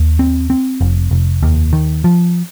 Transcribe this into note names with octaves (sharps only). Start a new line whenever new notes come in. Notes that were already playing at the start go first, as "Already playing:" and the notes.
Already playing: D#2
C4
C4
F1
F1
D#2
D#3
F3